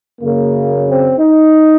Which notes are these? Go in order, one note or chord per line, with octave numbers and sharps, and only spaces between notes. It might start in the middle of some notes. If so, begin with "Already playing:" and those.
F#2 C#3 A#3
C4
D#4